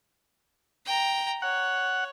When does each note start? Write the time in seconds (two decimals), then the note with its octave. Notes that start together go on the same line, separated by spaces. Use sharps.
0.86 G5 A#5
1.42 C#5 F#5